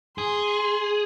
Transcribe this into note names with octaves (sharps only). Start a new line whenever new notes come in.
G#4 C6